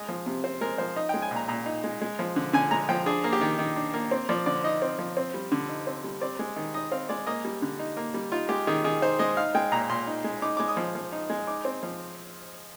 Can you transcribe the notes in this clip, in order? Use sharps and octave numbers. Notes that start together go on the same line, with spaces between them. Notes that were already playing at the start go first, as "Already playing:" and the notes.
Already playing: G#3 D#5
F3
C3
C4 C5
G#3 A#4
F3 C5
D#4 D#5
G#3 G5
G#5
A#2
A#5
A#2 A#5
D#4
G#3
G#3
F3
D3
D3 G#5
G#3 A#5
F3 G5
D4 G#4
A#3
G4
D#3
D#3
D4
A#3
C4
F3 D5
D3 D5
D#4 D#5
C4
F3
C4
G3
D3
D#4
C4
G3
C4 D5
G#3
D#3
D#4 D#5
C4 F5
G#3 D5
A#3 D#5
G3
D3
D#4
A#3
G3
D#4 F4
G#3 G4
D#3 G#4
D#3 G#4
D#4 C5
G#3 D#5
D#4 F5
G#3 G5
A#2 A#5
A#2 C6
D#4
G#3
D#4 D6
G#3 D6
D#6
F3
F3
D#4
G#3
D#4 D6
C4
F3